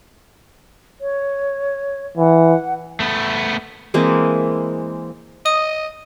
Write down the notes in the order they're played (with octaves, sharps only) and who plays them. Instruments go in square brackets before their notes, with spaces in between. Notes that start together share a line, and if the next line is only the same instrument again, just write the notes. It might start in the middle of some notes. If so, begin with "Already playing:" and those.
[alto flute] C#5
[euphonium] E3 [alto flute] F#5
[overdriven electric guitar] A3 B3
[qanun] E3 G#3 A#3 C4
[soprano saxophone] D#5 [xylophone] D#6